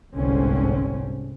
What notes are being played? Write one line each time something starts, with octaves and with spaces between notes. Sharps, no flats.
G1 C2 G#2 D3 C4 C#4